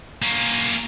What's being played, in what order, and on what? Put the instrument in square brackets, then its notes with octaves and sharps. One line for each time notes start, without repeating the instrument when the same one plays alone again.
[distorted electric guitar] A#3 C#4